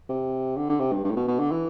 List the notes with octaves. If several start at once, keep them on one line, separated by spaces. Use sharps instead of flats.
C3
D3
D3
C3
G2
G2
A2
B2
B2
D3
E3